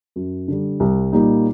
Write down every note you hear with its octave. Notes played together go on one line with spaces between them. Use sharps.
F#2
D3 G3
C2
A#2 G3 A#3 D#4